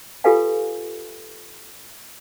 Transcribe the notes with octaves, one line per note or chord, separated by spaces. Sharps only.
F4 G4 A4 B4 F5 G#5